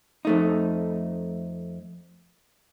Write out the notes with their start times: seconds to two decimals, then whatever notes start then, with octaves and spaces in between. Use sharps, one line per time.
0.25 F2 A3 D#4